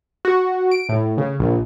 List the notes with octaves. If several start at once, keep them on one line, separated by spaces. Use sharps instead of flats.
F#4
D7
A2
C#3
A#1